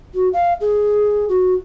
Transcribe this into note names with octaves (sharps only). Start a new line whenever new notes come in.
F#4
F5
G#4
F#4